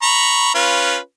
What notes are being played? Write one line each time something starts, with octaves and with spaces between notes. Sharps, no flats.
A#5 B5 C#6
C#4 F4 B4